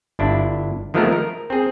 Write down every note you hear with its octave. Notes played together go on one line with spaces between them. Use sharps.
G1 D4 E4
D#3 F3 G#3 A3 B3 A#4
A#4
C4 G#4